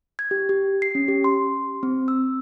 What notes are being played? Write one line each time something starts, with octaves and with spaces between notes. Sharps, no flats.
G#6
G4
G4
C7
C#4
G4
C6
C4
E6